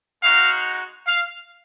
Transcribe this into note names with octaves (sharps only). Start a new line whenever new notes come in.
G#3 D#4 F#4 F5
F5